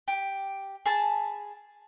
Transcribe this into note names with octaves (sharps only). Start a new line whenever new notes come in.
G4
G#4 A5 B5